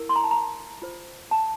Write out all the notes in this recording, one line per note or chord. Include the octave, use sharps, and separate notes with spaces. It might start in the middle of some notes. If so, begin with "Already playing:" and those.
Already playing: E4 A#4
C6
A#5
A5
A#5
F4 C5
A5